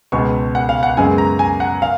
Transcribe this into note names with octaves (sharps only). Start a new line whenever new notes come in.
C#2 B2 G#3 B3 C#6
F#5
F5
F#5
F#2 C#3 G#3 B3 G#5
A#5
G#5
F#5
F5